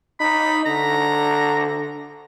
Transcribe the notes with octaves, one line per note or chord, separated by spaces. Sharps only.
D#4 B5
D3 A#5